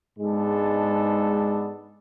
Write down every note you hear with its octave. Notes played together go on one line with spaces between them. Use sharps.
G#2 G#3 B3 D4 A4